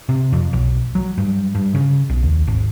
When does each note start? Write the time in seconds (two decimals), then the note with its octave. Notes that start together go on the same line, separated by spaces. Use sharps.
0.09 C3
0.32 F2
0.53 B1
0.95 F#3
1.18 G2
1.55 G2
1.75 C#3
2.10 B1
2.23 D#2
2.47 G#1